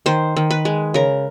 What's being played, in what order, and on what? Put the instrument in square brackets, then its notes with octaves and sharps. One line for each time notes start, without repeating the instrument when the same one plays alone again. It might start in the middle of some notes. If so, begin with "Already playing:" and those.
[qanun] D#3 C5
D#3
B4
G#3
C#3 A#4